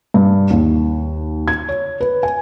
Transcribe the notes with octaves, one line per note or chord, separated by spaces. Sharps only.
G2
D#2
G#6
C#5
B4
G#5